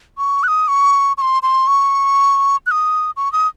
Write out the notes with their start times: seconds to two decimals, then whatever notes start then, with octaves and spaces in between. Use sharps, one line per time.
0.18 C#6
0.43 F#6
0.48 D#6
0.68 C#6
1.18 C#6
1.22 C6
1.43 C6
1.67 C#6
2.66 F#6
2.71 D#6
3.17 C#6
3.33 D#6